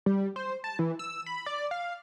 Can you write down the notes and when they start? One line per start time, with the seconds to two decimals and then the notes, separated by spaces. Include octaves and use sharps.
0.06 G3
0.36 C5
0.64 A5
0.79 E3
0.99 E6
1.26 B5
1.46 D5
1.71 F5